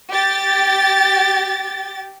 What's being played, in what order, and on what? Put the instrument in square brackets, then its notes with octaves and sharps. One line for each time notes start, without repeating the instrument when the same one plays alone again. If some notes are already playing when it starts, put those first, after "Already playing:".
[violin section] G4 A6